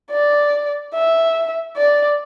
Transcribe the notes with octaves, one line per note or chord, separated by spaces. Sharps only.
D5
E5
D5